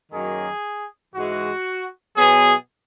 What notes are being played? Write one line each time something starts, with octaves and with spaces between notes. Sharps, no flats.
F#2 D#3 F#3 A#3 G#4
G#2 E3 G#3 F#4
B2 F#3 B3 G#4